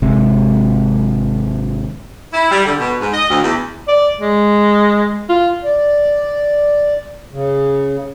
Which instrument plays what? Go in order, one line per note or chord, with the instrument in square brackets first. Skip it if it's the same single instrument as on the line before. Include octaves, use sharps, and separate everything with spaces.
[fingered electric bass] G#1 C3 G#3
[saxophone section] E4
G3
D3
B2
G#2
D#5
D2
E2
[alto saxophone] D5
G#3
F4
[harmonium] D5
C#3